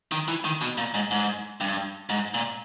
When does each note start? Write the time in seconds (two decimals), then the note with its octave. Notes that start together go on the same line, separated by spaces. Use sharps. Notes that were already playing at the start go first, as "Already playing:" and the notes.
0.12 D#3
0.28 E3
0.45 D#3
0.61 B2
0.78 A#2
0.94 G#2
1.11 G#2
1.61 G2
2.10 G#2
2.34 A#2